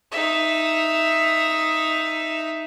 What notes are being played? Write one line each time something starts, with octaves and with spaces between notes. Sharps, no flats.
D#4 E5